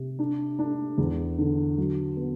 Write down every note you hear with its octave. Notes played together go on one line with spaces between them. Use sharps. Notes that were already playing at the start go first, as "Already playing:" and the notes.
Already playing: C3
D4
D4
E2
D3
F#3
B3